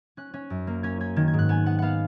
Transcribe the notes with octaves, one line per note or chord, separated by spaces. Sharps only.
C#4 F#6
C#4
F#2
A#3
C#4 G#6
C#4 G#6
D#3 G#6
G#6
G#2 F#6
B3 G#5
B3 F#5
B3 F5 F#5